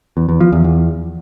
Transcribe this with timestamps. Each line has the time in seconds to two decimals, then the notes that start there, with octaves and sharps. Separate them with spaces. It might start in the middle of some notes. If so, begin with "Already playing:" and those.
0.17 E2
0.29 E2
0.40 F3
0.52 E2
0.64 E2